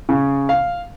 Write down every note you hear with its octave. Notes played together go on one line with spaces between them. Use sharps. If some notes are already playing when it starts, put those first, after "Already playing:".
C#3
F5